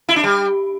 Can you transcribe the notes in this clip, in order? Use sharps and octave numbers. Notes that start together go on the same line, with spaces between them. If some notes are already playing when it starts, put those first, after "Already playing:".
E4
D4
G3